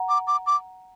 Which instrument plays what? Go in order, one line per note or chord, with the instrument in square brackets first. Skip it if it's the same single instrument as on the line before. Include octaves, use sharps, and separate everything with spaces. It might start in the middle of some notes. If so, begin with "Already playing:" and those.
Already playing: [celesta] F#5 A#5
[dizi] D6
D6
D6